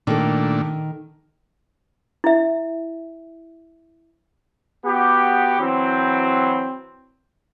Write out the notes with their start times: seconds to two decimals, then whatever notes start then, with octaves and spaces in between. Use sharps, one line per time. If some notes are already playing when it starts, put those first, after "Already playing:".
0.07 A#2 D#3 A3 D4 A4
2.24 E4 E5
4.85 B3 F#4 G4
5.59 E3 F#3 C4